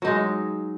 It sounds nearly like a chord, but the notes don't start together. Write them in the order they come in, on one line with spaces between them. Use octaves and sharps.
F#3 D#4 G#3